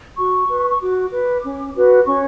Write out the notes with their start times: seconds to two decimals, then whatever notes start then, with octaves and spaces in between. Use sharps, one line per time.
0.18 F#4 C#6
0.49 B4
0.69 C#6
0.80 F#4 D6
1.12 B4
1.43 C#4
1.75 F#4 B4
2.06 C#4 C#6